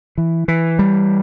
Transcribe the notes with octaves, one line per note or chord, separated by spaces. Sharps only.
E3
E3
G3